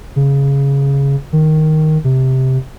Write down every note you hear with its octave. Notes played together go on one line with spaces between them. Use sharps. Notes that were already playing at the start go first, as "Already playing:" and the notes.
C#3
D#3
C3